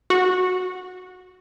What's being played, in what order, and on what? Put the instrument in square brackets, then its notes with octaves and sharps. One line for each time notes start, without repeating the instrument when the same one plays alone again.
[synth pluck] F#4